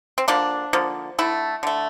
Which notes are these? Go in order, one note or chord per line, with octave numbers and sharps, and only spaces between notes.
C4
D3 F3 A#3 D4
D3 F3 A#3
D3 A3 E4
D3 A3